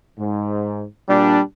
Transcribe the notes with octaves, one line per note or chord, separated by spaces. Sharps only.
G#2
A#2 G3 D4